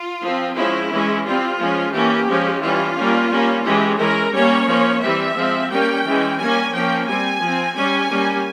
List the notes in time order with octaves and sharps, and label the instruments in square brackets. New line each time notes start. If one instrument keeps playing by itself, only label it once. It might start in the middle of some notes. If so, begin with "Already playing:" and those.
Already playing: [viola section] F4
F3
C4
F3 G#3 C#4 E4
E3 G#3 C#4
G3 C4 F4
F3 G#3 C#4
E3 A#3 C#4 G4
F3 G#3 C#4
E3 G3 C#4 F4
G3 A#3 C#4
G3 A#3 C#4
E3 G#3 C#4 G4
E3 G#3 C#4 A#4
G3 A#3 C#4 C#5
F3 A#3 C#4
E3 G3 C4 E5
F3 G#3 C4
G3 A#3 C#4 G5
E3 G#3 C#4
G3 A#3 C#4 G#5
F3 A#3 C#4 G5
G3 C4 G#5
F3 C4
G3 C#4 G#5
G3 A#3 C#4